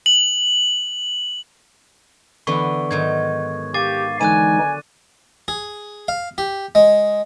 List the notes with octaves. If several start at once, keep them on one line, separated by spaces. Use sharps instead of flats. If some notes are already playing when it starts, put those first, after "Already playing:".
F#7
D3 E3 B3 C#6
G#2 D#3 F#3 G#6
G4 F5 D6 A6 D#7
D3 E3 F#3 G#3 D#4 G#5 F#6 D#7
G#4
F5
G4
G#3